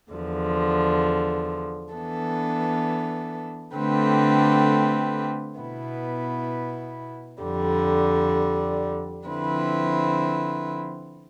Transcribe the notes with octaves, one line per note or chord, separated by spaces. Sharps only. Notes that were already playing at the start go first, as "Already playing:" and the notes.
E2 D3 F3
E3 B3 D4 A4
D3 A3 C4 G4 B4
B2 B3 E4
F2 D3 G3
D3 F3 C4 E4 B4